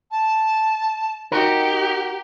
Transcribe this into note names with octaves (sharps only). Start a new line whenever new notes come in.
A5
D#4 F#4 G4 A#4